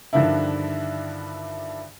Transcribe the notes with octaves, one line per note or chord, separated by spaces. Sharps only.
G2 D3 D#3 F3 D4 E4